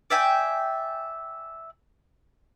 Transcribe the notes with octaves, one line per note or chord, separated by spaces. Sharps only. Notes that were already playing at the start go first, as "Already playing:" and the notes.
D5 E5 G5 G#5